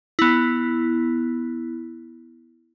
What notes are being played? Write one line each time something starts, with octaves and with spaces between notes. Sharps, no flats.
B3 E4